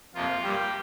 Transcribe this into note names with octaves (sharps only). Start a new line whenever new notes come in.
F2 C3 F3 A#3 F4
G2 G3 A#3 G4